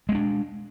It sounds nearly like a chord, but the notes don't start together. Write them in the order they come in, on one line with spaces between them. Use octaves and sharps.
G#3 C4 D4